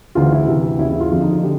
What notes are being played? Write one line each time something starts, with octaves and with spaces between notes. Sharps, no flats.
D2 C#3 E3 F4
E4
D2 C3 E3
D#2 C#3 E3 E4
E4
F4
F2 D3 F4
D#4
F4
D3 G4